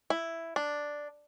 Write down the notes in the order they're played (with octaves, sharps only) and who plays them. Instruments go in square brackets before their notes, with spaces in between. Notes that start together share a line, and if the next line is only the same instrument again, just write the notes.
[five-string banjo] E4
D4